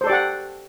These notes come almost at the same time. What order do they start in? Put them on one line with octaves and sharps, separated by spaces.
C5 A4 D5 G4 F#5